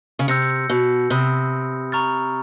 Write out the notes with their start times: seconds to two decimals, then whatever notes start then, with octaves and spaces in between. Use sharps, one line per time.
0.19 C#3
0.28 C3 E6 G6 A#6 C#7
0.70 B2
1.10 C3 B5 D#6 G6
1.92 A#5 C#6 F6 A6